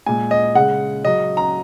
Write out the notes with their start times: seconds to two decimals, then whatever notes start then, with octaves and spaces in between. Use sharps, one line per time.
0.06 A#2 G#3 G#5
0.31 D#5
0.55 C#3 G#3 F#5
1.05 C#3 F#3 D#5
1.37 A#5